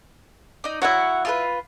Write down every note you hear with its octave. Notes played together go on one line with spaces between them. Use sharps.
D#4 D5
F#3 E4 F#4 C#5 F#5
F4 A4 B4